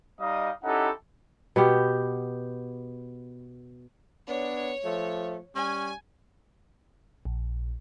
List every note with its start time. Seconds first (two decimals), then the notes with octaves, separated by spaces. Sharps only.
0.20 G3 D#4 D#5 F5 D#6
0.64 C#4 D#4 E4 G4 A4 F#5
1.56 B2 B3 G4
4.28 B3 D4 C#5
4.85 F3 A3
5.55 G3 C#4 G#5
7.25 A#1